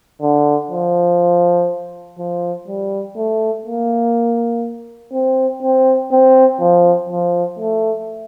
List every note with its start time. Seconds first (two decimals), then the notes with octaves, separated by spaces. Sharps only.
0.22 D3
0.71 F3
2.18 F3
2.68 G3
3.16 A3
3.66 A#3
5.13 C4
5.62 C4
6.11 C4
6.60 F3
7.09 F3
7.59 A3